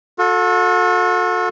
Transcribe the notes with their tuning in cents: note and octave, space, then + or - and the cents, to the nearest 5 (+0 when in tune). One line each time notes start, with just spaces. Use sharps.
F#4 -45 A4 +0